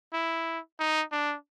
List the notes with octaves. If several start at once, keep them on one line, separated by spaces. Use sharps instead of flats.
E4
D#4
D4